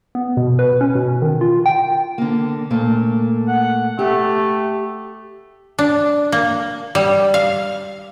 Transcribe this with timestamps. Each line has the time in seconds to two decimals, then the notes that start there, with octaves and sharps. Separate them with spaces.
0.15 B3
0.37 B2
0.59 B4
0.81 C#4
0.95 B2
1.22 D#3
1.41 F4
1.66 G5
2.18 D3 A#3
2.70 A#2 A3 A#3
3.48 F#5
3.99 A3 G4
5.79 D4
6.32 A#3
6.95 G3
7.34 F5